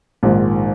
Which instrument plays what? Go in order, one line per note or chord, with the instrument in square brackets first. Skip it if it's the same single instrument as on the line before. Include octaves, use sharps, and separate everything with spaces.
[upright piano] A#1 G#2 D#3